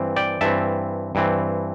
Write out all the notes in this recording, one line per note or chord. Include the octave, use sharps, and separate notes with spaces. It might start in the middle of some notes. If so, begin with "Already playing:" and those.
Already playing: G2 E3 C4
D5 G5
G2 E3 C4 E5 A5
G2 E3 C4